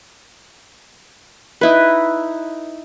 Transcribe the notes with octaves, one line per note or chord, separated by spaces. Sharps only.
D#4 E4 B4